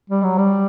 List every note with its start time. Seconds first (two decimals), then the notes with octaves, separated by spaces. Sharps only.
0.10 G3
0.23 F#3
0.38 G3